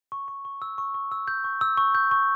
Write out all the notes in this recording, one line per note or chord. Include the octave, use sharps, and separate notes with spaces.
C#6
C#6
C#6
E6
C#6
C#6
E6
G6
C#6
E6
C#6
G6
C#6